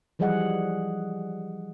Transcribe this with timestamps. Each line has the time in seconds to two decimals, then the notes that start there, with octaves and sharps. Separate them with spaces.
0.19 E3 F3 G3 G#4 D#5 F#5